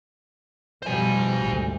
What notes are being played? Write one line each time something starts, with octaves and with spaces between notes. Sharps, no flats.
B2 F3 G3 C5 G#5
G#1 D2